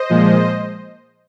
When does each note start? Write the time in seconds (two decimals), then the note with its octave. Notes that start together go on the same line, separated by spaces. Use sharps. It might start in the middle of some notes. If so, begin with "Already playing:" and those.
Already playing: C5 D#5
0.10 A#2 F3 G#3